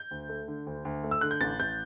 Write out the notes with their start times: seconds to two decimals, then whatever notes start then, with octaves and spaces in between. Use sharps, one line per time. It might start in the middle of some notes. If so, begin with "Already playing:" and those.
Already playing: G6
0.11 D2
0.29 A3
0.48 D3
0.66 D2
0.85 D2
1.04 A3
1.11 E6
1.21 D3 F#6
1.31 G6
1.41 A1 A6
1.59 A1 G6